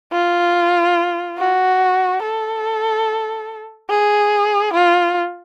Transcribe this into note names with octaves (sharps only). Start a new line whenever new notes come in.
F4
F#4
A4
G#4
F4